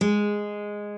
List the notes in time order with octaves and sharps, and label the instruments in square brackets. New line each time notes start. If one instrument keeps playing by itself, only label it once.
[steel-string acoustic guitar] G#3